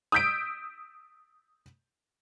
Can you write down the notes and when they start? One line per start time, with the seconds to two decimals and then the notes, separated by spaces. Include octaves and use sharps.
0.12 D#6 E6 G6 B6 D7